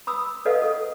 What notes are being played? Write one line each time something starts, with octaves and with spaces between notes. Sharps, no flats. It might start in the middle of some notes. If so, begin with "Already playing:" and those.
B5 D#6 E6
A4 B4 D#5 F5 F#5
A4